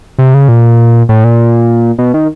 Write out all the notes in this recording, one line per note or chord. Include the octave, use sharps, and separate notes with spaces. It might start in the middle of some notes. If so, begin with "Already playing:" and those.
C3
C#3
A#2
A2
A#2
B2
D#3